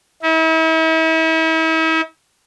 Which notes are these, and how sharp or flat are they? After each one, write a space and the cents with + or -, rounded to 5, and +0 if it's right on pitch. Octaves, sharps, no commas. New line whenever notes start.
E4 -40